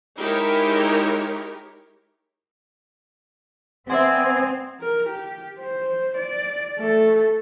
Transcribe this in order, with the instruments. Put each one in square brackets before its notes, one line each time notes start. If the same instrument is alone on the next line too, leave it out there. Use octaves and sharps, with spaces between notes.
[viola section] G#3 D#4 E4 G4 A#4 C#5
[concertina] B3 G#5 [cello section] C4 [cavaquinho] C5 D5 E5
[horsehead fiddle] A#4
G4
C5
D5
A3 A4